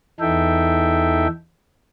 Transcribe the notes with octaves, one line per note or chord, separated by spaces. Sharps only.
E2 E3 D#4 A4 E5 G5